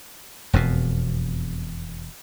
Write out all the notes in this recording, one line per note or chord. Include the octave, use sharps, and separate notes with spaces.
E1 F2 B2